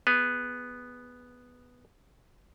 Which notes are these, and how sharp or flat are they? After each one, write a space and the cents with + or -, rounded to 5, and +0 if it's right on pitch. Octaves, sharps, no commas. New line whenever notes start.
B3 +0 G#4 -15